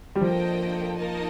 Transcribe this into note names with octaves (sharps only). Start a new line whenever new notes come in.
G3
F3 A#3 D4 A4 D#5 G5
A#3 D#4 A#4 D#5 A5